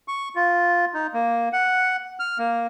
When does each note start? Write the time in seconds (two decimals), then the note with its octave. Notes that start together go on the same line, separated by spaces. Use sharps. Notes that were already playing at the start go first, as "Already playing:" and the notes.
0.08 C#6
0.35 F4
0.94 D#4
1.14 A#3
1.53 F#5
2.20 F6
2.38 A#3